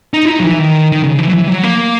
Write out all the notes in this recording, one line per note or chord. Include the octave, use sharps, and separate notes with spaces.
D#4
E4
D#4
F#3
E3
D#3
D#3
C#3
E3
F#3
E3
F#3
A#3